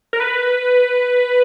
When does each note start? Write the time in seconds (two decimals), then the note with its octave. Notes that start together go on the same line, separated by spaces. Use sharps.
0.13 A#4
0.20 B4